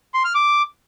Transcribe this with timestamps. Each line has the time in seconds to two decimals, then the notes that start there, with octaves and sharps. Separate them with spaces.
0.14 C6
0.24 F6
0.35 D6